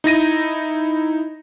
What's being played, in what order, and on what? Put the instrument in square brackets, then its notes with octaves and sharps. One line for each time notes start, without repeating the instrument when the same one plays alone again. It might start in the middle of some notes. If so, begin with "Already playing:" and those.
[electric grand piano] D#4 E4 A#6 D#7